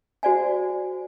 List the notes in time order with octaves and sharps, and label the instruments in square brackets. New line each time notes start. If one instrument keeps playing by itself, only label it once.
[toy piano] F#4 C5 D5 F5 G#5